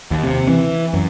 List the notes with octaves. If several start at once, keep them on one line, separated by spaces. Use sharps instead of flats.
D#2
C3
E3
F#2